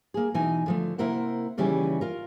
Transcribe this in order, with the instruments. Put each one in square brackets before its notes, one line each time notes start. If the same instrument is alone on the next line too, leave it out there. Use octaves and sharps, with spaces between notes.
[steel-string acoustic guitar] A#3 G#4
B2 E3 D#4 G#5
D3 F3 A3
C3 A#3 E4 A#4 C5 F#5
D#2 C#3 E3 G3 C#4 G#5
F4 A#4